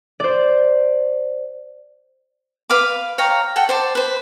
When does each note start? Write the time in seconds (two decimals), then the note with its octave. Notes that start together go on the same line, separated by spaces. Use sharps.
0.20 C5 D5
2.70 B4 F5 B5 D6
3.18 C#5 F5 G5 A#5
3.56 A4 F#5 G5
3.69 C5 D5 A5
3.95 B4 C5